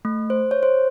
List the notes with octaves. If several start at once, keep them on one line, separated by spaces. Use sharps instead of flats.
A3
C5
C#5
C5